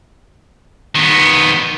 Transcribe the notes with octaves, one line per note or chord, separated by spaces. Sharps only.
D#3 B3